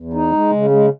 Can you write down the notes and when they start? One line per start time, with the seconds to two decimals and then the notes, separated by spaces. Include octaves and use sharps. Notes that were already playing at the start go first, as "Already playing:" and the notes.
Already playing: E2
0.13 D#4
0.32 G#3
0.52 C#3
0.70 G#3